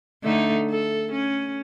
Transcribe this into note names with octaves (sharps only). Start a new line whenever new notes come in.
D3 A3 D#4
A4
C#4